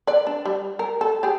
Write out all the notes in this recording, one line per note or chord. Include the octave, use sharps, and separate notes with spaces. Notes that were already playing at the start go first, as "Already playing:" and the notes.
B4 D5
D4
G3
A#4
A4
G4 G#4